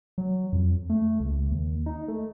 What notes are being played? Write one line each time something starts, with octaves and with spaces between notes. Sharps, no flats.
F#3
F2
A3
C#2
D#2
D#4
A3